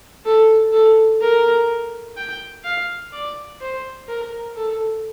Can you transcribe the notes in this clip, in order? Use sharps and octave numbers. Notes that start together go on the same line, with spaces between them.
A4
A4
A#4
G5
F5
D5
C5
A#4
A4